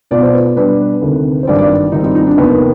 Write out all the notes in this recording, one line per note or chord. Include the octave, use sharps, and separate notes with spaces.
B1 B2 B3 F4 D5
C5
B4
B2 G3 D4 B4
D2 C3 D#3
C5
G#1 G2 D#3 G3 D5
D5
G#1 G#2 G3 C4 D#4
D#4
D#4
D4
F1 D#2 D#3 B3